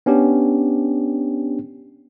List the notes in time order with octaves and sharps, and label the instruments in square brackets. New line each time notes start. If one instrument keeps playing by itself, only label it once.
[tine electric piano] B3 C#4 D4 G4